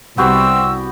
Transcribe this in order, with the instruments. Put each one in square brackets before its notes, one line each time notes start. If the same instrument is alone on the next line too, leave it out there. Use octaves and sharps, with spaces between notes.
[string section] C2 [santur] B3 F#4 G4 [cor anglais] C4 [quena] E6